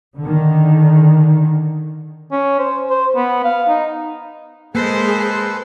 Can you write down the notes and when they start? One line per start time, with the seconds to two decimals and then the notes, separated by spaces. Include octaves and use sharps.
0.19 D3 D#3
2.32 C#4
2.59 C5
2.90 C5
3.16 B3
3.45 F5
3.69 D#4
4.75 G#3 A#3 G#4 A4 B4 C5